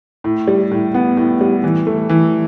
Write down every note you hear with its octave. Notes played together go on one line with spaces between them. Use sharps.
A2
G3
A2
B3
A2
G3
E3
A3
E3